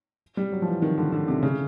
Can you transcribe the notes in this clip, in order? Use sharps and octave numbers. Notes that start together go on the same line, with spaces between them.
G3
F#3
F3
E3
D#3
D3
D3
C3
C#3